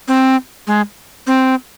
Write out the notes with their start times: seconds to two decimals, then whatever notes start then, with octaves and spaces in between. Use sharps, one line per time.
0.08 C4
0.67 G#3
1.27 C4